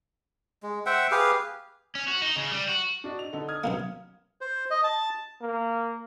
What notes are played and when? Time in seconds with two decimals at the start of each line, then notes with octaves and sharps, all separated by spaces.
0.63 G#3
0.86 C5 E5 F#5 G5
1.11 G4 G#4 B4 F5
1.95 C#4
2.08 F#4
2.22 D#4
2.36 C#3
2.51 G3
2.69 F#4
3.04 D4 F#4 D#5
3.19 F7
3.33 D3 D#4 A4
3.48 D#6 F6 G#6
3.64 F#2 B2 A#3
4.41 C5
4.71 D#5
4.84 A5
5.41 A#3